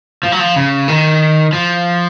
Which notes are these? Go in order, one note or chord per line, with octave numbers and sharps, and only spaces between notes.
F3
F#3
F3
C#3
D#3
F3